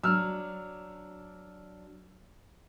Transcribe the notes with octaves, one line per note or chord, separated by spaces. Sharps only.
F#3 D4 E6 F6